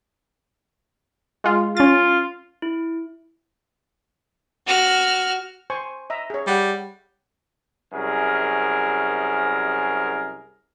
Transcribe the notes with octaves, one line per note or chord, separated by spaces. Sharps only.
G#3 F4
C#4 F4 A6
E4
F#4 F6
C5 G#5 C#6
D#5 E5 A#5
G#4 C#5
G3 C#5 F#5
C2 F#2 G#4 A#4